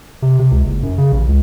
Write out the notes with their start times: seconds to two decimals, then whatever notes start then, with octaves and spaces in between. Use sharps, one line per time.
0.22 C3
0.39 C3
0.51 C#2
0.64 F#1
0.83 F#2
0.98 C#3
1.12 A1
1.28 C#2